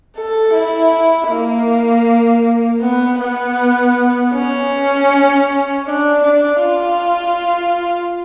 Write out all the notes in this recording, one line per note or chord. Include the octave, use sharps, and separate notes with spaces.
A4
E4
A#3
B3
B3
C#4
D4
D4
F4